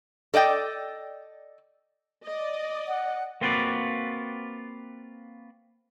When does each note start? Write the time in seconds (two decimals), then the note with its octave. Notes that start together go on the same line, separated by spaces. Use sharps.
0.34 A4 D5 D#5 G5
2.24 D5 D#5
2.88 F#5
3.41 A#3 C4 F4 F#4 B4 D5